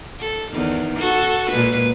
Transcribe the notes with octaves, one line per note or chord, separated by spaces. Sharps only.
A4
E2 D#3
F#4 A4
A#2 G#3 B4